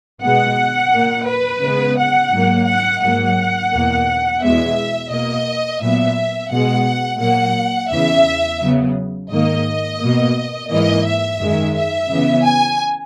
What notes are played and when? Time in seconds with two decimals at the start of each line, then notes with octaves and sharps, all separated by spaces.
0.23 B2 G#3 B3 F#5
0.93 A#2 A#3
1.28 B4
1.63 C#3 G#3 B3
1.98 F#5
2.33 G#2 F#3 A#3
2.67 F#5
3.03 G#2 F#3 A#3 F#5
3.73 E2 B2 A#3
4.42 E2 B2 G#3 B3 E5
5.12 B2 A#3 D#5
5.82 A#2 F#3 B3 E5
6.52 B2 G#3 B3 F#5
7.21 A#2 F#3 A#3 F#5
7.91 E2 C#3 E3 E5
8.61 C#3 F#3 B3
9.31 G#2 D#3 A#3 D#5
10.00 B2 A#3
10.70 G#2 E3 A#3 D#5
11.06 E5
11.40 F#2 D#3 G#3
11.76 E5
12.10 C#3 E3 B3
12.45 G#5